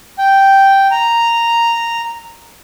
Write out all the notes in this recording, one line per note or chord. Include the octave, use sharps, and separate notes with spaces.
G5
A#5